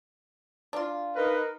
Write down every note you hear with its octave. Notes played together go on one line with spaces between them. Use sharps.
D4 F4
D#4 A#4 B4